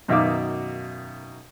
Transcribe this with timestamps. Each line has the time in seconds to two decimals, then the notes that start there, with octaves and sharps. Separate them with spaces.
0.08 F#2 B2 D#3 E5 F5 D6